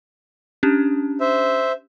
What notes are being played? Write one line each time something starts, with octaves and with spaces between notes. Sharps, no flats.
C#4 D4 G4
C5 E5